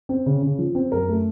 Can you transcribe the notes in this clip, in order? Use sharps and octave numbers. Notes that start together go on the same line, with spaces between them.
C4
C#3
C#3
F3
C4
F#2 A#4
A3